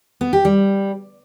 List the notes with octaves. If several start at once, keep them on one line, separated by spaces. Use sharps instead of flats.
B3
G4
G3